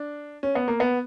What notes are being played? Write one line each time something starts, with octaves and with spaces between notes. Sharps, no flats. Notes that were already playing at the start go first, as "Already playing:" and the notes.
Already playing: D4
C#4
B3
A#3
B3